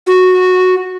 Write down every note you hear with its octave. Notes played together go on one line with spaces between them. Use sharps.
F#4